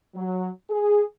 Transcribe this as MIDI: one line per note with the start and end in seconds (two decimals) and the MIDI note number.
0.14 0.47 54
0.69 1.02 68